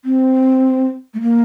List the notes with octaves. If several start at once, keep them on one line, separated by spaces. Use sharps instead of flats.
C4
A3
A#3